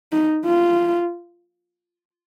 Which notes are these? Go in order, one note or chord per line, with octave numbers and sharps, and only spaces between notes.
D#4
F4